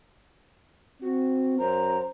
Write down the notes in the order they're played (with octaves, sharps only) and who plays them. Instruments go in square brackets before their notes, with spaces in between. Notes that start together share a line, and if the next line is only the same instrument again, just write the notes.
[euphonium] C4 [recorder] F#4
[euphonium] F#2 [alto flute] C5 [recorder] A#5